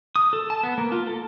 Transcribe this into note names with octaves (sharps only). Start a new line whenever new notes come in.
D#6
A4
A5
B3
A#3
F4
A4